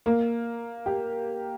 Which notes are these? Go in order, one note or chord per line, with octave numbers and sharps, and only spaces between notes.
A#3
G4